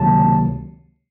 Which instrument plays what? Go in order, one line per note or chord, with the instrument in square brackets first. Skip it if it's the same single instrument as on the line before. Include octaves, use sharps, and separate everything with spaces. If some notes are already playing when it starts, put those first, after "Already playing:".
Already playing: [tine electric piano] C#2 C3 D#3 F#3 A#3 A5